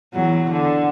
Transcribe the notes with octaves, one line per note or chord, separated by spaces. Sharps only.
E2 F#3
D3